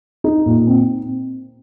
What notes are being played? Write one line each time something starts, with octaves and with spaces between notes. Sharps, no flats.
D#4
A#2
C4